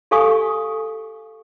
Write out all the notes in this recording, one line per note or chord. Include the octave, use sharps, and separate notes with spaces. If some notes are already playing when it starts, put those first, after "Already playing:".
G4 A4 F5 G#5 C#6 D#6